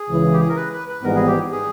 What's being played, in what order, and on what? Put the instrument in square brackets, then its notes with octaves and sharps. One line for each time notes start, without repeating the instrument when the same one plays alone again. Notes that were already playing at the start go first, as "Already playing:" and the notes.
Already playing: [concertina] G#4
[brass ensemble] C#2 C#3 E3
[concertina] G4
G#4
A#4
B4
B4
B4
[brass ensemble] G#1 G#2 E3 G3 B3 [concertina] A#4
[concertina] G#4
G4
G#4